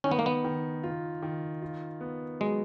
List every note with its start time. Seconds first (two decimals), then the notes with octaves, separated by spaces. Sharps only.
0.04 D#3 C#4
0.11 B3
0.19 A#3
0.26 B3
0.44 D#3
0.83 F4
1.23 D#3
1.62 F4
2.01 B3
2.40 F#3 G#3